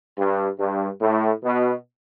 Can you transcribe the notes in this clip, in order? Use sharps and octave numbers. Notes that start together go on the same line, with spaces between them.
G2
G2
A2
B2